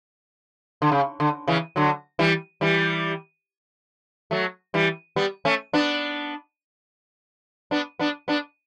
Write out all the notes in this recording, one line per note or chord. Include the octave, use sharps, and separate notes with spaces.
D3
C#3
D3
C#3 E3
D3 F#3
E3 G3
E3 G3
F#3 A3
E3 G3
G3 B3
A3 C#4
B3 D4
B3 D4
B3 D4
B3 D4